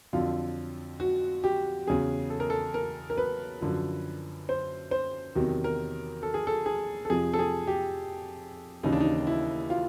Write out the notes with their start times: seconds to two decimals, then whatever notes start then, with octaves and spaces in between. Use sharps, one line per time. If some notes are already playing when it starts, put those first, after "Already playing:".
0.13 F2 D3 F#3 F4
1.00 F#4
1.44 G4
1.87 E2 C#3 F#3 G#4
2.30 A4
2.40 A#4
2.50 A4
2.74 A#4
3.10 A#4
3.17 B4
3.61 F#2 D3 F3
4.49 C5
4.91 C5
5.35 E2 C3 D#3 F#3
5.64 A#4
6.23 A4
6.34 G#4
6.47 A4
6.66 G#4
7.05 A4
7.10 F2 C3 F3 G#4
7.33 A4
7.39 G#4
7.67 G4
8.83 D#2 C#3 E3 D#4
8.93 D4
9.00 D#4
9.27 E4
9.70 F4